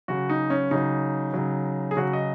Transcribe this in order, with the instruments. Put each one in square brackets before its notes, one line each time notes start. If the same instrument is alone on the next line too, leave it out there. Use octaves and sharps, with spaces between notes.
[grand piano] C#3 F#3 F#4
D#4
C#4
C#3 F#3 D#4
C#3 F#3
G#4
C#3 F#3 F#4
D#5